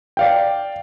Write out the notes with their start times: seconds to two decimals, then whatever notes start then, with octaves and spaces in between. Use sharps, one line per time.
0.17 D5 F5 G5